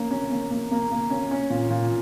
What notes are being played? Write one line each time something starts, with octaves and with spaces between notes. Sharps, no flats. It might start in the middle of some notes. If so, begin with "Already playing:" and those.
Already playing: A#3 C#4
C#4
A#3
A#3
A#3
A#3
C#4
C#4
A#2
A#2